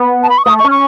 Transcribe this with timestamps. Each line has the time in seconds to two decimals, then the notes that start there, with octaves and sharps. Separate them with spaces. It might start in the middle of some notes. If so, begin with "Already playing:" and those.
Already playing: B3
0.23 A5
0.30 B5
0.38 C#6
0.45 A3 D#6
0.59 C#6
0.65 C#4
0.71 C#6